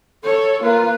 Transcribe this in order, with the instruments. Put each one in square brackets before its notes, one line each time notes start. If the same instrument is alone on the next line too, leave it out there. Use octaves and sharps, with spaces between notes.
[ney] A4 [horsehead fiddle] C#5
[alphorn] A#3 [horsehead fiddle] F4 [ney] B4